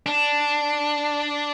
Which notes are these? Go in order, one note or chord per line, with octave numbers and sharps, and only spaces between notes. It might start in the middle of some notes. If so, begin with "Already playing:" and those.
D4